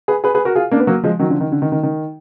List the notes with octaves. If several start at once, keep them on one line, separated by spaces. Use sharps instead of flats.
G#4 B4
G#4 B4
G#4 B4
F#4 A#4
F4 G#4
A#3 D4
B3
F#3 A#3
F3 G#3
D#3 F#3
D3 F3
D#3
D3
D#3
D#3
D#3